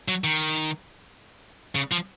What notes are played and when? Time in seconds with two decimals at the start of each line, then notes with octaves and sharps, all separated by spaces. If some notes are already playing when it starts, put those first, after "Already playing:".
0.08 F#3
0.24 D#3
1.75 C#3
1.92 F3